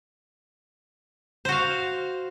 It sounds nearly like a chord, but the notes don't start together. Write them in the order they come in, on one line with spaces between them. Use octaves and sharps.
C5 F#4 F5